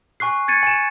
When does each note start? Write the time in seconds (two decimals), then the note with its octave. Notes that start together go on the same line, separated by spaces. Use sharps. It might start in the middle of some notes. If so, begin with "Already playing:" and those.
0.20 G#5 C#6 F#6 C7
0.48 G#6 A6 C#7 D#7
0.63 G#5 E7